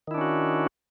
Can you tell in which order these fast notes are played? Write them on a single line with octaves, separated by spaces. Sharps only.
D#3 E4 D4 C#4 F#4